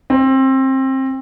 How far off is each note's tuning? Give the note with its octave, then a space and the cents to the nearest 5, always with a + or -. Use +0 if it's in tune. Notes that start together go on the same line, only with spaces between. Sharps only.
C4 +25